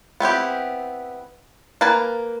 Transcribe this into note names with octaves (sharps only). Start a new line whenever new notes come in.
B3 C4 E4 G4
A#3 A#4 B4 G#5 A5